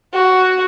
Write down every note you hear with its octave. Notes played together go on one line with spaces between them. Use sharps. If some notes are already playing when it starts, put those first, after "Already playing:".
F#4